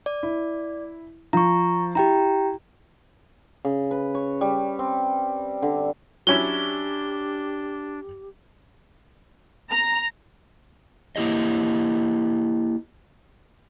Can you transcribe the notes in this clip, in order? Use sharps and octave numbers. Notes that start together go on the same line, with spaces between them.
D5
E4
F3 A#5 C#6
E4 G4 G5 A#5
C#3
B4
C#5
G3
C4
D3
F#3 C#4 D4 E4 G4 G7
A#5
A#3 E4 G4 D#5